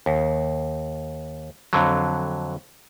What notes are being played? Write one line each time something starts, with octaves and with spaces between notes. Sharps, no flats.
D#2
F2 D3 F#3